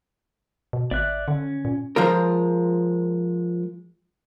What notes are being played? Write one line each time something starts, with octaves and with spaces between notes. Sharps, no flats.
B2
G#1 D5 E5 F#6
D3 C#4
A#2
F3 G#3 F4 A#4